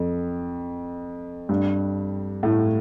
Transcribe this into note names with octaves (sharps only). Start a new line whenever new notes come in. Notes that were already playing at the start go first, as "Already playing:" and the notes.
Already playing: F2
G2
A2